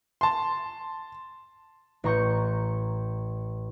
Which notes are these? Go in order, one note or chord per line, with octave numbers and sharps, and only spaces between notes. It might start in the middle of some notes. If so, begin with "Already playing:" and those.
A5 C6
A1 A#5 C#6 G6